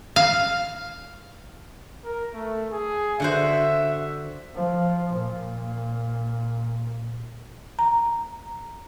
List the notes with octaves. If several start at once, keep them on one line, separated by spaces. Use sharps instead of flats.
F5
A#4
A3
G#4
D3 F#4 C5 E5
F3
A#2
A#5